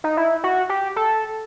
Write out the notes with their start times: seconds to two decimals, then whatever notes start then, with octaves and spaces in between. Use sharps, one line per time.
0.04 D#4
0.17 E4
0.44 F#4
0.69 G4
0.96 A4